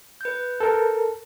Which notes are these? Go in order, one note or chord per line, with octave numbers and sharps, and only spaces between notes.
B4 G6
A4 A#4